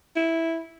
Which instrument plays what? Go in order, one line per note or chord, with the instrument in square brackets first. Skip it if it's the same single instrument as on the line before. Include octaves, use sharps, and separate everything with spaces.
[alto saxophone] E4